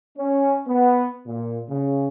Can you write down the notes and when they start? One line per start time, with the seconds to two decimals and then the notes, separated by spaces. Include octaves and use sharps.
0.18 C#4
0.68 B3
1.27 A#2
1.70 C#3